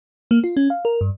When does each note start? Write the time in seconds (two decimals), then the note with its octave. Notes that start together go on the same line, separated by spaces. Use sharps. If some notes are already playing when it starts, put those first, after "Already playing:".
0.31 A#3
0.44 F4
0.57 C#4
0.70 F5
0.85 A#4
1.01 G2